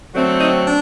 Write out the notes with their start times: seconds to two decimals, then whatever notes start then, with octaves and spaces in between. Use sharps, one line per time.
0.15 D3 F#3 A3 C4
0.40 D#4
0.66 D4